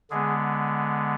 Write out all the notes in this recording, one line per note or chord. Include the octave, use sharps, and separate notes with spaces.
D3 G#3 B3 G#4